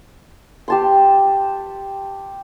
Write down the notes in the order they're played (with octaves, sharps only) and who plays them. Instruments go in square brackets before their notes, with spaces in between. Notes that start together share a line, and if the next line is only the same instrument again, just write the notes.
[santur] G4 A5 C6